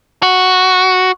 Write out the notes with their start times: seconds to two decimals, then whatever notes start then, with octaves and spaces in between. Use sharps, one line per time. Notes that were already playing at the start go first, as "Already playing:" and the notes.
0.23 F#4